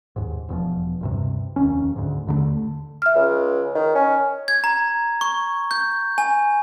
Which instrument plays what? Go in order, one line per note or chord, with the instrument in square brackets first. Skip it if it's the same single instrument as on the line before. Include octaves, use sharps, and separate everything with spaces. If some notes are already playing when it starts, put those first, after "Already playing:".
[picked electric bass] D#2 G#2
E1 E2 F3
D2 G2 C3
F1 D#2 C#4
D2 G#2
D#2 D3 F#3 A3
[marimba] E5 F6
[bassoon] C#2
D#3
C#4
[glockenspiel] G#6
A#5
C#6
G6
G#5